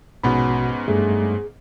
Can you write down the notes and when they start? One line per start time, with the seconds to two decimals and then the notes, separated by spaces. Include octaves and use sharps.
0.24 A#1 G#2 B2 B3 C#4 F#4 B5
0.88 G2 G3 A3 G#4